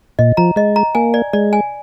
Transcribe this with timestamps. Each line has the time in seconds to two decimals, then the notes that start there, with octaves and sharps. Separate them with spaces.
0.19 A#2 D#5
0.37 F3 A#5
0.56 G#3 D#5
0.76 A#5
0.95 A#3 G#5
1.14 D5
1.33 G#3 D5
1.53 G#5